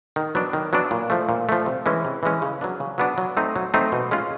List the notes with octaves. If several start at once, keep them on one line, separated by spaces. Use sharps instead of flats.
D#3
F#3 B3 D4
D#3
F#3 B3 D4
A#2
F3 A3
A#2
F3 A3
C3
E3 G#3 C#4
C3
E3 G#3 C#4
C#3
F#3 B3 D4
C#3
F#3 B3 D4
F#3
A3 C4 D#4
F#3
A3 C4 D#4
B2
G#3 C#4 F4